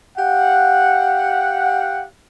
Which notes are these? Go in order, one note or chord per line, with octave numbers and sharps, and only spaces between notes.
G4 F5 F#5